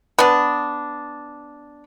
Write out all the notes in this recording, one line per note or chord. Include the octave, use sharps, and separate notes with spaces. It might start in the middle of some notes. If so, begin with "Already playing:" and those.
B3 D4